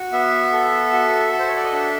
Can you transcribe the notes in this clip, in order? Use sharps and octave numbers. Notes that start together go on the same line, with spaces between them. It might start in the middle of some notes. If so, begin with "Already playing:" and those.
Already playing: F#4
B3 E5
A4
F#4
A4
C5
C#5
D5
D#5
D4 E5